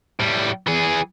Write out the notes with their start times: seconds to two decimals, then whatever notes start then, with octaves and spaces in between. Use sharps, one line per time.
0.20 A2 G3
0.67 E3 G#4